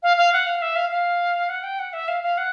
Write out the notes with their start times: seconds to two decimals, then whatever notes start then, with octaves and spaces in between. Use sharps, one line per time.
0.03 F5
0.17 F5
0.33 F#5
0.46 F5
0.62 E5
0.76 F5
0.90 F5
1.49 F#5
1.63 G5
1.79 F#5
1.93 E5
2.08 F5
2.22 F5
2.38 F#5